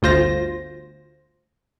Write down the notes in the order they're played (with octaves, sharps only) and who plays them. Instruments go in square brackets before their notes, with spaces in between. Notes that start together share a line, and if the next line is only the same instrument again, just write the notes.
[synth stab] G1 D2 F4 C5 A#6